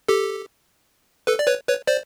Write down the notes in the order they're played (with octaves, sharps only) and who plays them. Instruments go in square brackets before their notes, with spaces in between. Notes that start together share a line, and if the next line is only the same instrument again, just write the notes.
[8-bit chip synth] G4 A4
A4 B4
D5
B4 C#5
B4 C#5
C5 D5